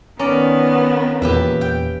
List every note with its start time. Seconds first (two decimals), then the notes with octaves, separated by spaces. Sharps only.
0.19 D#3 B3 C#4 A#4 D5
1.22 E2 A#2 G4 B4 E5
1.61 G5